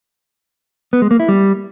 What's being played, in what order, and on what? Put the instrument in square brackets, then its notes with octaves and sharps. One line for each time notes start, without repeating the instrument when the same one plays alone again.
[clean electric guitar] B3
G#3
A#3
E4
G3